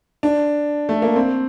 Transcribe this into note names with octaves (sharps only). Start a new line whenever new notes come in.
D4
A3
A#3
C4